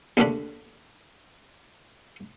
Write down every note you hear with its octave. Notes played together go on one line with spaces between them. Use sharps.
A#1 D#2 D3 A3 D4 B5